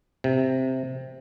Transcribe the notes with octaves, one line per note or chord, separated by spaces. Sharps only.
C3